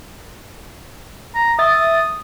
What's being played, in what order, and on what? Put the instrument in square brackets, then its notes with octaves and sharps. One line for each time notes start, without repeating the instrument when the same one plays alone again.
[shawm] A#5
[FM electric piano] E5 A6 [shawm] D#6